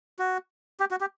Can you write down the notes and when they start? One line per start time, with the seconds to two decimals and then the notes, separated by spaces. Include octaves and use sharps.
0.19 F#4
0.80 G4
0.91 F#4
1.01 G4